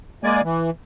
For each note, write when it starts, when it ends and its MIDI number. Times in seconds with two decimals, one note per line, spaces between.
0.24 0.41 56
0.24 0.41 58
0.24 0.41 74
0.24 0.41 80
0.45 0.70 52